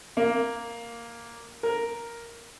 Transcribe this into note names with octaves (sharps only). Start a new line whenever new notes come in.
A#3
A#4